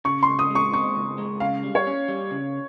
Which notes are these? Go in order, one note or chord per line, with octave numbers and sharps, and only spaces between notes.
C#3 C#6
C6
C#2
D#6
G#3
C#6
C4 C#6
C#2
G#3
C#3 F5
G3
C#5
C#4
G3
C#3